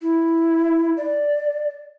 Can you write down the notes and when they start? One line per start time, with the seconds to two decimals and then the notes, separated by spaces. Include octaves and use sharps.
0.02 E4
0.97 D5